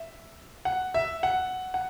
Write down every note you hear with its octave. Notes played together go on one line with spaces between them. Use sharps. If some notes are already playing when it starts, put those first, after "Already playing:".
Already playing: E5
F#5
E5
F#5
F#5